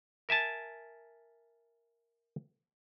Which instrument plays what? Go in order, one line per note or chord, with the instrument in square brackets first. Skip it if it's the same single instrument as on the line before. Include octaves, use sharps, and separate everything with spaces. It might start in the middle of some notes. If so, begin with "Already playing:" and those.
[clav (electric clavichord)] A#4 E5 G#5 A5